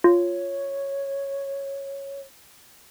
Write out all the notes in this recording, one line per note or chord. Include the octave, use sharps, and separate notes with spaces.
F4 C#5